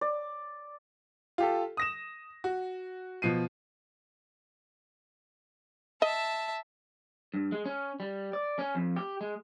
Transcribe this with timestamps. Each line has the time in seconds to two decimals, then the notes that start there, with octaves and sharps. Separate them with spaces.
0.01 D5
1.38 F4 G4 A4
1.77 D#6 A#6 E7
2.44 F#4
3.22 B2 F3 C7 D#7
6.02 D#5 E5 A5
7.34 G2
7.52 G#3
7.65 C#4
8.00 G3
8.33 D5
8.59 C#4
8.75 F2
8.96 G4
9.21 G#3